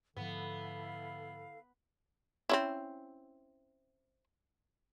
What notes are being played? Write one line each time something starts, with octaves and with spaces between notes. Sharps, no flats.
G#2 D3 F3 B3 E4 A4 F5
C4 C#4 E4